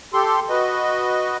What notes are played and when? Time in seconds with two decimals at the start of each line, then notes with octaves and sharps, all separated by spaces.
0.13 G4 A4 C6
0.49 F#4 B4 D#5